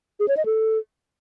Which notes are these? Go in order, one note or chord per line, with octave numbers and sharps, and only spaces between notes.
G#4
C#5
D#5
A4